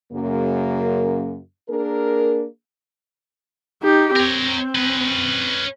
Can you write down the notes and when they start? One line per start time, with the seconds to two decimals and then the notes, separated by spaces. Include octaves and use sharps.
0.12 F#2 C#3 A#3
1.69 A#3 D4 G#4 A#4
3.83 D#4 G4
4.16 C4 A#4 C#5
4.75 C#4 B4